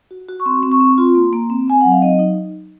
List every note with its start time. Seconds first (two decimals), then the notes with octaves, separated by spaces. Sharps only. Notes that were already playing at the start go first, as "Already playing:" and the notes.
0.11 F#4
0.28 F#4
0.40 C#6
0.46 C4 C6
0.63 C4
0.72 C#6
0.80 C4
0.98 F4 C6
1.15 A#3
1.33 A#3
1.50 C4
1.68 C4 G#5
1.81 F#3 F#5
1.92 F5
2.02 D#4 D#5
2.19 D#4